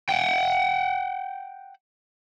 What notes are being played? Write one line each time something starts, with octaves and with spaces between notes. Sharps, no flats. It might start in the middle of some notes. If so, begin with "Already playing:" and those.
F#5 G5